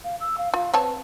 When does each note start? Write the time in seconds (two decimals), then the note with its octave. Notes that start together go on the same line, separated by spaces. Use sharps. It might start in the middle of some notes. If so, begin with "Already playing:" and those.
0.04 F5
0.20 E6
0.38 F5
0.54 F4 F5
0.74 C4 B4 C#5 A5